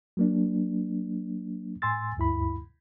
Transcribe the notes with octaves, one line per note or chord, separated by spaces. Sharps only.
F#3 A#3 D4
A2 G#5 C6 E6 A6
D2 G2 E4 B5